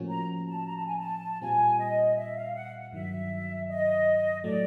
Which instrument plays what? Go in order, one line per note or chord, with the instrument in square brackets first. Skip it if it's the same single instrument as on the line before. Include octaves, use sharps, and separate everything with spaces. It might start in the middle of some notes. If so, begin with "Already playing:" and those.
Already playing: [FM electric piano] A2 F3 A#3 C#4 F#4
[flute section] A#5
A5
A#5
A5
G#5
A5
[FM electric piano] A#2 G3 C4 F4 [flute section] G#5
[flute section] D#5
E5
F5
F#5
[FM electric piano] G2 D#3 F#3 [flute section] E5
[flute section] D#5
[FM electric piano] A2 F#3 A3 [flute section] D5